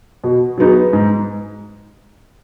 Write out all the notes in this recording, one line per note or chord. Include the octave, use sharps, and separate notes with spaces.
B2
F#3 B3 D#4 G#4
G#2